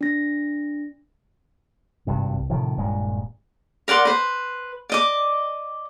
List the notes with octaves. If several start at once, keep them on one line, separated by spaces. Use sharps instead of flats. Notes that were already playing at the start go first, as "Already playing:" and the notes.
D4 A#6
G#1 G2 C3
C2
A2 C3 D#3 F3
D#1 G2 A#2 G#3
A#4 D5 F#5 C6
B4 C5
D5 D#5 D6